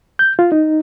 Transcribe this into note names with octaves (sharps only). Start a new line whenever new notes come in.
G6
F4
D#4